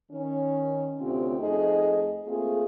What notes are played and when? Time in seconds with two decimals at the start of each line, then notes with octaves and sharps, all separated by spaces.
0.12 D#3 C#4
1.01 D2 C3 C4 C#4 F4 G4
1.40 F2 A3 D#4 G#4 D#5
2.27 A3 A#3 C4 F4 G#4